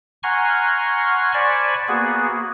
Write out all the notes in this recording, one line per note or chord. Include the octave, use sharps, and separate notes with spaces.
F#5 G#5 A#5 C6 C#6 F6
C5 D5 G#5 A5 B5 C#6
A#3 B3 F#4 G#4